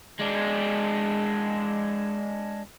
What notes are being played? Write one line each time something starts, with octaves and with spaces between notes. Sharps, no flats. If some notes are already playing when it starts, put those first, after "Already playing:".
G#3 D4